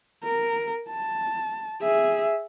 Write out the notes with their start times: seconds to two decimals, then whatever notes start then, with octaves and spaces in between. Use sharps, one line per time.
0.24 A#4
0.90 A5
1.82 G#4 E5